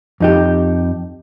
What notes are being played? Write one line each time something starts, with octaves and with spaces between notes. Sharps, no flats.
F2 D#4 G4